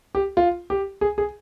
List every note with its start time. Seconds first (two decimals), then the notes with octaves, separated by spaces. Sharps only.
0.15 G4
0.37 F4
0.70 G4
1.01 G#4
1.18 G#4